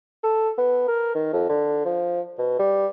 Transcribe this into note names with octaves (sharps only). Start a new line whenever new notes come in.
A4
B3
A#4
D#3
F2
D3
F3
B2
G3